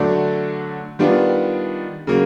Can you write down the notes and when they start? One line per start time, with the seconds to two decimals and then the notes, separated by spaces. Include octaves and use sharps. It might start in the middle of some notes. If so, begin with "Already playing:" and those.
Already playing: D3 F#3 A3 D4
0.99 D#3 G3 B3 D4 F4
2.07 C#3 F#3 A#3